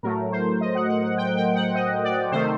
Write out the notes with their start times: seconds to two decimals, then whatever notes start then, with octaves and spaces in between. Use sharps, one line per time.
0.03 A2 F#3 A3 A#4
0.32 C5
0.61 D#5
0.75 F#5
0.90 F#5
1.04 F#5
1.17 G5
1.37 G5
1.55 F#5
1.75 D#5
2.04 D5
2.31 C3 D#3 A3 C5